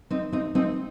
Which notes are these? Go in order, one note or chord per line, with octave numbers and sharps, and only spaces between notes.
C4 D#4
C4 D#4
C4 D#4